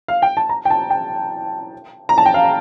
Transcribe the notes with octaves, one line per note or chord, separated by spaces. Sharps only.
F5
G5
A5
A#5
G5
A5
G5
A#5
A5
G5
F5